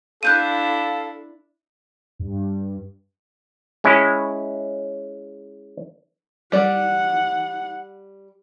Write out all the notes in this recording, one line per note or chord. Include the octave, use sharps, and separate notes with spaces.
D4 E4 A4 F5 F#6 G6 D#7
G2
G#3 C#4 E4
G3 D5 F#5